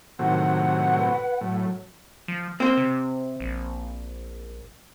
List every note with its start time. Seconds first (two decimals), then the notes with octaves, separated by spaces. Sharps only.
0.19 A2 C3 D#3 F#3 F#5
1.00 B4
1.41 A2 F#3
2.28 F3
2.60 A#3 C4 C5
2.77 C3
3.40 A#1